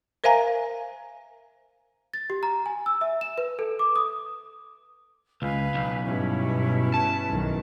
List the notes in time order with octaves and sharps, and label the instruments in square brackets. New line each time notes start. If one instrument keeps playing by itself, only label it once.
[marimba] A#4 C5 E5 F5 G#5 A#5
[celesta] A6
G4
A#5
G#5
E6
E5
E7
B4
A4
D6
D#6
[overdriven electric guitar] C#2 [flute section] B4 F5 G#5
[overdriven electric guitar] B1
[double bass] G2 B2 [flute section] C#4 E4 B4
[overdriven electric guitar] A5
[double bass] B1 D#3